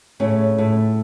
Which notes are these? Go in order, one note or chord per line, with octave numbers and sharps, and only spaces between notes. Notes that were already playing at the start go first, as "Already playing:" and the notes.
A2 C#3 C#4
A2